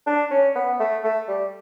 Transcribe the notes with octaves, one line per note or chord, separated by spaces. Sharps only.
D4
C#4
B3
A3
A3
G3